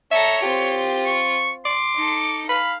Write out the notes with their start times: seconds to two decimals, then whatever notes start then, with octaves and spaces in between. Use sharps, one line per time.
0.12 A4 C#5 E5 A#5
0.42 C4 F4 G4
1.06 C#6
1.65 C6 D6
1.95 D#4 A4
2.49 F5 B5